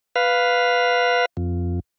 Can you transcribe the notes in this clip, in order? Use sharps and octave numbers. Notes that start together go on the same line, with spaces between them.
B4 F5
F2